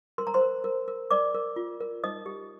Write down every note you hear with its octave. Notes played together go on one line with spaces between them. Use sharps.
A#4 C6
A#5
C5 C6
A#4
A#4
A#4
A#4 D5 D6
A#4
F4
A#4
D#4 D#5 D#6
G4